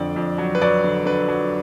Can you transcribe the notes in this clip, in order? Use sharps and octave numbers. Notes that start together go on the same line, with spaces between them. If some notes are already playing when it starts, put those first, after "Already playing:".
Already playing: F2 D3 D5
F2
F#3
B4
F#3 D5
D3
D3 B4
F#3